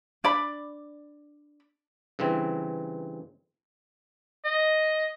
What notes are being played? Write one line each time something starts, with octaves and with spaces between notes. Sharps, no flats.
D4 D5 B5
G2 C#3 E3 C4
D#5